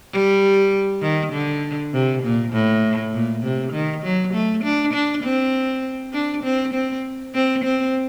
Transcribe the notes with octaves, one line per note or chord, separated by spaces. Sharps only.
G3
D#3
D3
C3
A#2
A2
A#2
C3
D#3
F#3
A3
D4
D4
C4
D4
C4
C4
C4
C4